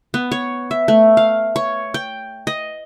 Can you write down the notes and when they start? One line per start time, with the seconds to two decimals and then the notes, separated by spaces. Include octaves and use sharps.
0.14 B3
0.32 C#5
0.71 E5
0.88 A3
1.17 F5
1.56 C#5
1.94 G5
2.47 D#5